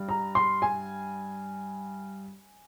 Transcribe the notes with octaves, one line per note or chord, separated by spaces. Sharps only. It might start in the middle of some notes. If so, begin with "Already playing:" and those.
Already playing: G2
A#5
C6
G#5